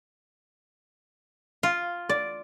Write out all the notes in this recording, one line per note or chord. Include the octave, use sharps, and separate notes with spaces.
F4
D5